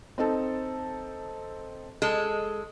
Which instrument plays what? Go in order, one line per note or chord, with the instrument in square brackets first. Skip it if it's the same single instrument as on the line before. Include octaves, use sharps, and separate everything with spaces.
[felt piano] C4 D#4 A4
[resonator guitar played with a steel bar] G#3 A4